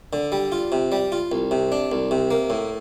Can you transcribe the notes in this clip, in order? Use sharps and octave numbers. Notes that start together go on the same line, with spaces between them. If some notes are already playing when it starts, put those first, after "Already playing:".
D3
G3
F4
C3
G3
F4
C2
C3
D4
C2
C3
A#3
A2